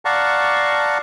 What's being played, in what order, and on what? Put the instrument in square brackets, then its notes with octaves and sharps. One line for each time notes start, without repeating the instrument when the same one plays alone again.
[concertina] D5 F5 F#5 A5 A#5 C#6